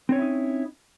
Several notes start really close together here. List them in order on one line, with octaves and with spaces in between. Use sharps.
C4 C#5 C#4 E4 D#4